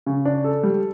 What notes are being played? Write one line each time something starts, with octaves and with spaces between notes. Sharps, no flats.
C#3
D4
A4
G3